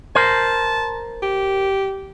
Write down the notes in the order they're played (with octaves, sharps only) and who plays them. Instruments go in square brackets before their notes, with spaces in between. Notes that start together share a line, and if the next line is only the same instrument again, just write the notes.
[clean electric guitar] A#4 C5 [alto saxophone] A5
[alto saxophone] G4